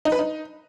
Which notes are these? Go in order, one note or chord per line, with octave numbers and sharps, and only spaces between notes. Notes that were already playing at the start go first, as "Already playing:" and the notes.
D#4
B4
D#4